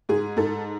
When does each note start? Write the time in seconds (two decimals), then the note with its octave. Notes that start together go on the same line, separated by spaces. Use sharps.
0.09 G#2 G#4
0.37 G#2 A4